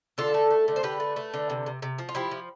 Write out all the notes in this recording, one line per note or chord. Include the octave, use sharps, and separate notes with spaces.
D3 F4 A4
A3
A3
D3
C5
D3 G4 B4
A3
A3
D3
C3
C3
C3
F3
F4
F3 E4 G4
F3